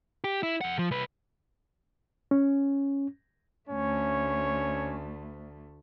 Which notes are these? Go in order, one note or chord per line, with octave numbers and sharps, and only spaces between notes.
G4
E4
F2 F#5
F3
C2 B4
C#4
D2 A3 C#4 C#5